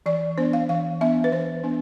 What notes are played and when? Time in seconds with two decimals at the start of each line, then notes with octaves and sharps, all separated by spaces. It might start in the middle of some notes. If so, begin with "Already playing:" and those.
0.06 E3 D5
0.37 B3 D4 C5
0.53 F5
0.69 E3 F5
1.01 B3 D4 E5
1.24 B4
1.32 E3 C5
1.63 B3 D4